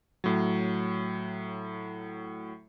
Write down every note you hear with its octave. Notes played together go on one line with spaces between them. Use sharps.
A2 F#3